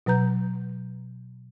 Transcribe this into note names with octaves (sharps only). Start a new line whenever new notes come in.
B2 F#3 B4 A#5 G6